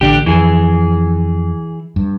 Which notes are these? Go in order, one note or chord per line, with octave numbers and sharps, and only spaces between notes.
A1 D3 D4 G4
F2 E3 G#4
G2